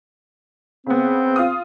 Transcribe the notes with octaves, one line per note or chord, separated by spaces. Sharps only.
C#3 B3 C4
F4 F5 D#6